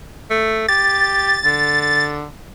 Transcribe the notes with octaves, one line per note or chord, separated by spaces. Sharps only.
A3
G4 A6
D3